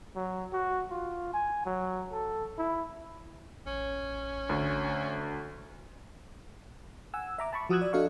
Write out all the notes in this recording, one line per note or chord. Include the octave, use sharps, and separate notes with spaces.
F#3
F#4
F4
G#5
F#3
A4
E4
A1 C#4
D2
F#5 G#5 E6
E5 A#5 D6
A5 B5 C#6
F3 F#4 D#6 E6 F#6 G#6
D5
D4 F#4 A4 D#5 F5 C#6